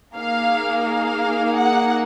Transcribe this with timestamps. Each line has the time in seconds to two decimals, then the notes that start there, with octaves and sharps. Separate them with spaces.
0.16 A#3 D#4 G#4 F5
0.86 F5
1.56 F#5